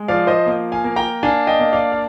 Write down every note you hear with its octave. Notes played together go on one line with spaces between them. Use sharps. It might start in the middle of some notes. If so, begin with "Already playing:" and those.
Already playing: G#3
F3 D5 F5
C5 D#5
A#3
F5 G#5
A#3
G5 A#5
D4 F5 G#5
D#5 G5
A#3
D5 F5
F5